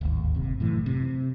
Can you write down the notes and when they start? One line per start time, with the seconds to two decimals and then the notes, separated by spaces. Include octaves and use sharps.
0.01 D1 G#1 D#2
0.35 F#1 C3
0.60 F#2 A2 E3
0.86 C3